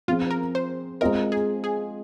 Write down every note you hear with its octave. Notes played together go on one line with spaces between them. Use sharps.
F3 C4 F4 G#4
A#4
C5
G#3 C4 F4 A#4 C5 D#5
G#4
G#4